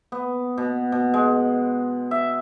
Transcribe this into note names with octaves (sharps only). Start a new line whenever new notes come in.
B3
B2
B2
G#3
E5